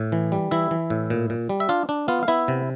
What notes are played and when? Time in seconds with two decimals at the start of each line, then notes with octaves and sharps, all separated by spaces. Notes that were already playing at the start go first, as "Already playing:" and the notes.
Already playing: A2
0.12 E3
0.32 G3
0.51 E3 E4 E5
0.71 E3
0.90 A2
1.10 A#2
1.30 A#2
1.49 G3
1.60 E5
1.69 D4 F4 F5
1.89 D4
2.08 B3 F4 F5
2.23 F5
2.28 B3 E4 E5
2.48 C3